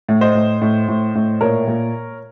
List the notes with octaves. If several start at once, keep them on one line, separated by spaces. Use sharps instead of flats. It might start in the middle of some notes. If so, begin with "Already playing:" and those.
A2
C5 D#5
A2
A2
A2
A2
A#2 A#4 C#5
A#2